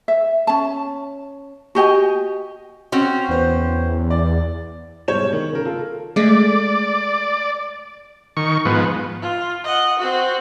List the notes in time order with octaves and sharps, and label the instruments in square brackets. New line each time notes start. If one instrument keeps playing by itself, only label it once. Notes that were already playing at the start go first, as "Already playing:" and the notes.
[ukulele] E5
C#4 A5
F#4 G4 D#5 G#5
[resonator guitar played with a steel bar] C4 C#4 F#4
[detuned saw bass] E2 [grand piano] B3 C5
[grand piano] D5
[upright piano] G#2 B2 G3 C#5 G6 E7
D#3
C#3 A#4
F4 A4
[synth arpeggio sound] G#3 A3 [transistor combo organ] D5
[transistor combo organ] D#3 C#6
G#2 F3 B3
[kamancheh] F4
D#5 F#5
C4 F#4